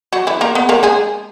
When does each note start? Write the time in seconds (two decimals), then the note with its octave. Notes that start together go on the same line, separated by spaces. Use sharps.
0.13 F#3 F#4
0.27 E3 E4
0.41 A#3 A#4
0.55 B3 B4
0.69 A#3 A#4
0.83 G#3 G#4